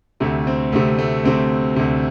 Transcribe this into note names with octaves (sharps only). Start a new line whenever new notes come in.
D2 C3 A3
C4
D2 C3 A3
A3
D2 C3 C4
D2 C3